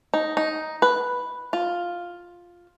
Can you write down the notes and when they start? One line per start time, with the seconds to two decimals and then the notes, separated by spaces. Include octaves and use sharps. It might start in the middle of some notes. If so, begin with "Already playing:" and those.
0.14 D#4
0.37 D#4
0.82 B4
1.53 F4